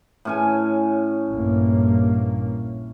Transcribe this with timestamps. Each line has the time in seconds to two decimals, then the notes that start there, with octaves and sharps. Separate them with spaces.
0.25 A2 C#4 G#5
1.29 A#1 G2 A#3